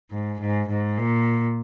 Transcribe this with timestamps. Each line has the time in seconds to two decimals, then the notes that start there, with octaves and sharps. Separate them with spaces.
0.11 G#2
0.40 G#2
0.69 G#2
0.98 A#2